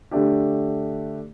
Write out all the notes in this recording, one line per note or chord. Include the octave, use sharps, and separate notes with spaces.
D3 A3 D4 G4